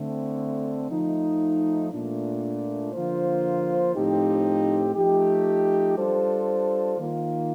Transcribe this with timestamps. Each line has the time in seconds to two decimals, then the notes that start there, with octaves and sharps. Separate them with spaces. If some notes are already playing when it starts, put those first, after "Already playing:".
Already playing: D3 A3 C4
0.89 F3 A3 D#4
1.91 A#2 A3 D4
2.93 D3 F3 A#3 F4 C5
3.94 A2 F3 C4 D#4 G4
4.95 F3 A3 D#4 G4
5.97 G3 D4 F4 A4 C5
6.97 D#3 A#3 F4